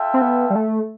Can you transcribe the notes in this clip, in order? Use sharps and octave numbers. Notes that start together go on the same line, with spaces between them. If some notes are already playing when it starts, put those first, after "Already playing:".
Already playing: F4 A4 E5 G5
C4
B3
G3
A3